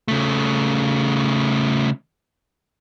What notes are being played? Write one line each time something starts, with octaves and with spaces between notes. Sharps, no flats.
C#3 A3